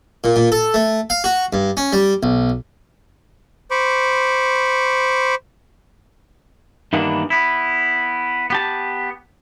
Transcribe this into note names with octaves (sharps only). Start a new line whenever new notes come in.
A#2
A#2
A4
A3
F5
F#4
G2
C#4
G3
B1
C5 B5 C#6 D6
G2 D#3 E3 A#3 B3 D4
B3 E4
B3 G4 A5